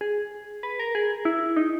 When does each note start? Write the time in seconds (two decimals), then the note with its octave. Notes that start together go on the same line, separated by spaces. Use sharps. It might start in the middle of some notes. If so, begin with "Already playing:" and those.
0.01 G#4
0.63 B4
0.80 A#4
0.95 G#4
1.25 E4
1.57 D#4